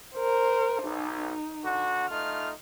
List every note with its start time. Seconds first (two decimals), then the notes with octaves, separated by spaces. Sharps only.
0.14 A#4 C5
0.84 B1 D#4
1.64 D3 F#4
2.10 A3 D#4 F4 F6